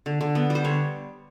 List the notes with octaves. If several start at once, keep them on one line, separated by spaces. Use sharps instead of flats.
D3
D3
B3
G3
C5
D3 C#5